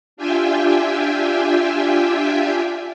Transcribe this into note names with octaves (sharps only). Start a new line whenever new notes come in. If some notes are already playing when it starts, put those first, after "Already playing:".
D4 F4 G4 E5 G5 G#5